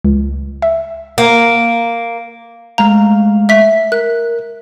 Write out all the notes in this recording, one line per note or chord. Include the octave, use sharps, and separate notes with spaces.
C#2
E5
A#3
G#3 A3 F5 A#5
E5 B6
A#4 F#6